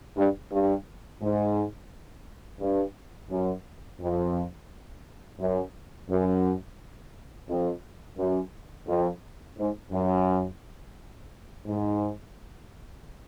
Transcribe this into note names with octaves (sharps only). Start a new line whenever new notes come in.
G2
G2
G#2
G2
F#2
F2
F#2
F#2
F2
F#2
F2
G#2
F#2
G#2